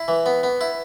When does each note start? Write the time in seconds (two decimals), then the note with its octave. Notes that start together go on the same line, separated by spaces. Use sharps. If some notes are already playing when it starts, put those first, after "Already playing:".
Already playing: E4
0.08 E3
0.26 B3
0.43 B3
0.61 E4